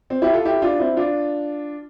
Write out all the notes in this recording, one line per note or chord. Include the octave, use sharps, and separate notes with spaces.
C4
E4 G4
F4 A4
E4 G4
D4 F4
C4 E4
D4 F4